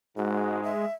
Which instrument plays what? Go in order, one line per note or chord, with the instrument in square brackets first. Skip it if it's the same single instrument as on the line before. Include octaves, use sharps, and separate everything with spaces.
[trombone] G#2 [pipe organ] G#3 [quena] F#4
[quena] E5